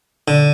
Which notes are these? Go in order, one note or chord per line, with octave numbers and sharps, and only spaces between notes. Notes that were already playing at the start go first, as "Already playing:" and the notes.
D3